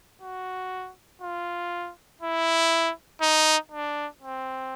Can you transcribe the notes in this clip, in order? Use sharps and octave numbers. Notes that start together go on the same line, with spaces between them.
F#4
F4
E4
D#4
D4
C4